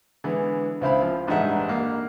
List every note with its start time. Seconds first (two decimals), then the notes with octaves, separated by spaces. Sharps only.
0.24 D3 E3 G#3 B3
0.81 C#2 C4 E4 C5 F5 B5
1.01 F3
1.27 A1 G2 G#3 D#4 E5 F#5
1.69 A#3